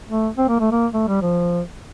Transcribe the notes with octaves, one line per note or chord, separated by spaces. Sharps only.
A3
C4
A#3
A3
A#3
A3
G3
F3